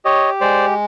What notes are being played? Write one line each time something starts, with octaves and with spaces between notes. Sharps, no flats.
G4 C#5 D#5
G#3 C5 D5